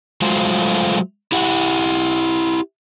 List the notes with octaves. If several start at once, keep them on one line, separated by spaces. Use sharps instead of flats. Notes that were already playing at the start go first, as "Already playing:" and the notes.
F#3 G#3 A3 F4 F#4 C5
E4 G4 F#5